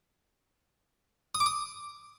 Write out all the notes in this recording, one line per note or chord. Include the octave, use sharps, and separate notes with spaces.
D#6
D6
D#6